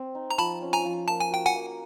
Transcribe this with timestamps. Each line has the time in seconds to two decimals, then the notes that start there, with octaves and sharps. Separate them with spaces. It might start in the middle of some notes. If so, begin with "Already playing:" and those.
Already playing: C4
0.15 D#4
0.31 A#5
0.38 F3 A5 B5
0.62 C#4
0.73 G#5 A#5
0.85 F3
1.08 A#3 A5
1.20 G#5
1.31 F#4 G5
1.45 F#5 G#5
1.55 A#3